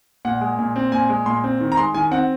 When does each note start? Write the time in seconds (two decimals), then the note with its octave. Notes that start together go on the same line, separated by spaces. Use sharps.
0.25 A#2 F#5
0.41 G#3
0.59 A#2
0.76 C4
0.92 A#2 G#5
1.09 G#3
1.26 A#2 C6
1.44 C4
1.61 D#3
1.72 A#5
1.77 G#3 C6
1.94 D#3 G#5
2.11 C4 F#5